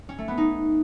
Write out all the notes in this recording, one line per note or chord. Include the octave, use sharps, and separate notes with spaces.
C#4
A3
B3
D#4